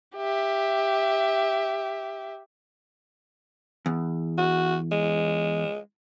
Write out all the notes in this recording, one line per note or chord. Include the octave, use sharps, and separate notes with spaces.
G4 E5
E2
F#4
G#3